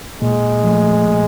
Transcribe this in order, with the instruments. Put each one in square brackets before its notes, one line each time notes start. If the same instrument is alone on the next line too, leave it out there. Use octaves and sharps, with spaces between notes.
[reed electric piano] A#2 [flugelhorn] G#3
[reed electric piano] F3 A3
A#2